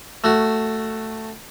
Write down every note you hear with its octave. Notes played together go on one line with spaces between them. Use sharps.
A3 F#4